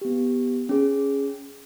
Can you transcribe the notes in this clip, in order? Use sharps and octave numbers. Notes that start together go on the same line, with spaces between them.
B3 G4
C#4 G#4